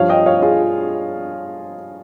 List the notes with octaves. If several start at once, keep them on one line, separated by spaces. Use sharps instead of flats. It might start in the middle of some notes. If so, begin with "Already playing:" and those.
Already playing: G2 F3 C#5 F5
D#5 G5
C#5 F5
F4 G#4